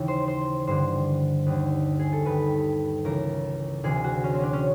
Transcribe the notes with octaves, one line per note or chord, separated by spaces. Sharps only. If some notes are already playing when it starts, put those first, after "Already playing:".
Already playing: D#2 C#3 E3
C5
C5
G2 D3 C5
D#2 D3
G#4
A4
G2 D#3 B4
C#2 C#3 E3 A#4
D2 C3 E3 G#4
F#4
C#4
C4
C#4 D4
C#4